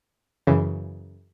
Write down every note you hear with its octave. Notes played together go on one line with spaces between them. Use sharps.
F#2 C#3 E3